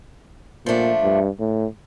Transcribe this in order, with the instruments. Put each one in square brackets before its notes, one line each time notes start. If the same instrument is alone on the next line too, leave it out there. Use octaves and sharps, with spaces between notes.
[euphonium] A#2 [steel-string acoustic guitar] F3 A3 D4
[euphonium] G2
A2